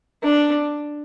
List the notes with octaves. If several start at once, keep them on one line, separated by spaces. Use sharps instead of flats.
D4